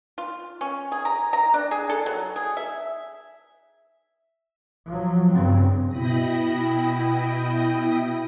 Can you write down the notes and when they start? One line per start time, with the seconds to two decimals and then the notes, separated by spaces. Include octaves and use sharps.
0.18 F4
0.61 C#4
0.92 G#4
1.05 A#5
1.33 A#5
1.54 D4
1.71 G#4
1.90 A4
2.06 F#3
2.36 G#4
2.57 E5
4.88 F3 F#3
5.32 G2 C#3 C4
5.89 B2 E4 G5 B5 D#6 A#6